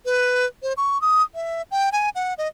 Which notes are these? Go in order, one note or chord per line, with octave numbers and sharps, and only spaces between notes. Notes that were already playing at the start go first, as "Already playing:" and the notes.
B4
C5
C#6
D#6
E5
G5
G#5
F#5
D#5